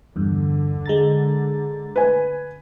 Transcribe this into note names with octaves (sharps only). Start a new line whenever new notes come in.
E2 G2 D3
G#3 A#5 A6
B4 G#5